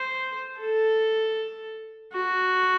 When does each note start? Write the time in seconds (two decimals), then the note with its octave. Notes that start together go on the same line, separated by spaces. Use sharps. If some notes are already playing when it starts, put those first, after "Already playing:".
Already playing: C5
0.59 A4
2.13 F#4